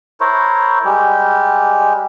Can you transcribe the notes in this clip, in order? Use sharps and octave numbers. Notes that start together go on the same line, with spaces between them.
E4 A#4 C5 C#5
G3 G#3 G4